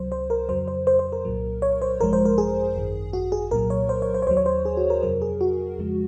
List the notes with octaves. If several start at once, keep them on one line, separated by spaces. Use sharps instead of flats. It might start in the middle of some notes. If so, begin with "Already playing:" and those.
Already playing: C#2 C3 F#3 C5
C5
A#4
F2 C#3 F#3 C5
C5
C5
C5
A#4
C2 A#2 F#3
C#5
C5
G#1 F#2 F3 G#3 A#4
C5
A#4
G#4
G#1 F#2 D#3
F#4
G#4
C2 A#2 F#3 A#4
C#5
C5
C#5
C5
C#5
D#2 D#3 F#3 C5
C#5
C5
G#4
F#4
A#4
F2 C3 F#3 A#4
G#4
F#4
F2 C#3 F3 G#3